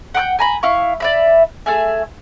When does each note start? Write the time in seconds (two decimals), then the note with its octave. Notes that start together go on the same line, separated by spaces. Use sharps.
0.15 F#5 G5 D6 G6
0.39 G#5 A#5 B5
0.63 E4 F5 C#6
1.00 D5 E5 B5
1.66 A3 G#4 E5 G#5